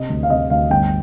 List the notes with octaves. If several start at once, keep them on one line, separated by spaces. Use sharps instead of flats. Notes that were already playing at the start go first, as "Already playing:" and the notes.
Already playing: C3 D#5
D2
F5
C3 D#5
D2 F5
G1 G5